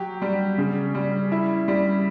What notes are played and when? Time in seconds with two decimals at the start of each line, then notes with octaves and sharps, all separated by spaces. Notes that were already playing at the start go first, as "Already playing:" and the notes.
Already playing: F#3 G4
0.22 G3
0.58 C#3
0.94 G3
1.32 E4
1.68 G3